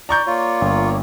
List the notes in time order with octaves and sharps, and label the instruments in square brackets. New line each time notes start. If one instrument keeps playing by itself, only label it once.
[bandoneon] D5 [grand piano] A#5 C#6 G6
[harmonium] A#3 C#5 D5 [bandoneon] F4
[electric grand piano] G1